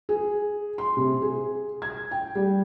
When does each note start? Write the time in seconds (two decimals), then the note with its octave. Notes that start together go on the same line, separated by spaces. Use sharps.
0.09 G#4
0.78 C6
0.97 C3
1.22 G#4
1.82 G#6
2.11 G5
2.35 G3